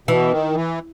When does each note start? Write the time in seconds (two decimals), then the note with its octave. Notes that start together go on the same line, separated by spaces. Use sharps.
0.08 B2 E3
0.31 D#3
0.55 E3